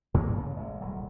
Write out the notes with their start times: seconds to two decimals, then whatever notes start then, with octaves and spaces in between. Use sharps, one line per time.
0.14 G2 A#2 C#3 A#3
0.37 C#3 A3
0.56 A1 G#3
0.81 D#1 C2 F#3